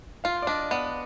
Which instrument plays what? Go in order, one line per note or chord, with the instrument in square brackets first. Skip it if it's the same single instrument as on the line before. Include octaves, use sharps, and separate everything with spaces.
[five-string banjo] F4 [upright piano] F5
[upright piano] D5
[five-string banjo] D4 [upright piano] D#5
[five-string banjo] B3 [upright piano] D5